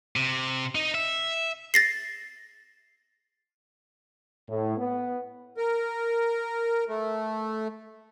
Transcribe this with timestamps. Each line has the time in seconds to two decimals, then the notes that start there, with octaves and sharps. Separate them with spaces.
0.16 C3
0.75 D#4
0.95 E5
1.74 A6 A#6 C7
4.48 A2
4.78 B3
5.57 A#4
6.89 A3